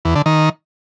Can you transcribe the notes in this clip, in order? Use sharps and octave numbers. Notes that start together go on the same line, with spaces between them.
E2
D3
D#3